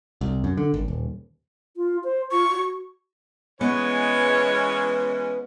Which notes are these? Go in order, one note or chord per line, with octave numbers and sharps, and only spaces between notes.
C2
F#2
D3
G#1
D#1
F4
C5
F4 C#6
F#4
E3 G#3 B3 C#4 C#5